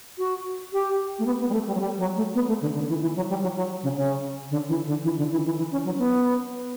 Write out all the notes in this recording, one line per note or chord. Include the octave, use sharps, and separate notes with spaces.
F#4
G4
A3
B3
B3
G3
A3
G3
F#3
G3
F#3
A3
B3
A3
D3
D3
E3
E3
F#3
G3
F#3
F#3
C#3
C#3
D3
E3
D3
E3
D3
E3
E3
E3
C#4
F#3
B3